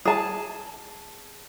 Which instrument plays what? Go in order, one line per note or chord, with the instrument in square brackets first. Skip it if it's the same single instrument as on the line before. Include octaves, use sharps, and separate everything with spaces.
[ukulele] G#4 A5